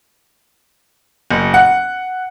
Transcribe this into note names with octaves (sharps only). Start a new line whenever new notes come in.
F#1
F#5